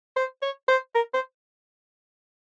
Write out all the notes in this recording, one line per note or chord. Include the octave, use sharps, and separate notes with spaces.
C5
C#5
C5
A#4
C5